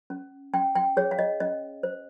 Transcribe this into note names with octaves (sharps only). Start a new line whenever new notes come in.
C#4
C#4 G5
G5
G#4 C#5
F5
D#5
C#4 D#5
C5